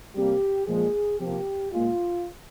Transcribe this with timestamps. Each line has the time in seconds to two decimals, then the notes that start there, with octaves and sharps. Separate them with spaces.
0.15 C3 G3 A#3 G4
0.66 A#2 F3 G#3 G#4
1.19 C3 F3 A#3 G4
1.71 A#2 G#3 F4